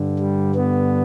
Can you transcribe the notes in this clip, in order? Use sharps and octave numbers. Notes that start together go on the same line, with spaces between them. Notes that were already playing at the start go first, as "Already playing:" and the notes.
Already playing: G2 D3
G3
B3